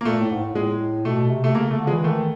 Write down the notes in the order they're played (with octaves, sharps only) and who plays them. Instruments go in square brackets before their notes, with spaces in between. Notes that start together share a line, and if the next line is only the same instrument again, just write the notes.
[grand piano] A#3
[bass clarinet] A#2 [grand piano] A3
[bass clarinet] A2
G#2
A2
[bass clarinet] A2 [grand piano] G#3
[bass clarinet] B2 [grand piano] A3
[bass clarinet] C3
[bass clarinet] C3 [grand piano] A3
[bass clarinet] C#3 [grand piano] A#3
[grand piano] A3
[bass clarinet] D3
[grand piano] G#3
[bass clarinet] E3
[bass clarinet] D#3 [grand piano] A3